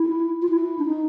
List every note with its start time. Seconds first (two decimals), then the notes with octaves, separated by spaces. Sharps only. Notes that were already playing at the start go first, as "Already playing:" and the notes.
Already playing: E4
0.42 F4
0.49 E4
0.79 D4
0.86 D#4